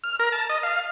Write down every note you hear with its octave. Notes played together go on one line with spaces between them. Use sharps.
F6
A#4
A5
D#5
F5